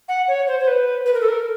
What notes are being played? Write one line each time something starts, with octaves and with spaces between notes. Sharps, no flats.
F#5
C#5
C5
C5
B4
B4
A#4
A4
A#4